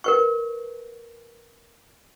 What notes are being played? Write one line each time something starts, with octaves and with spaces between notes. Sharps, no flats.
A#4 B4 C#6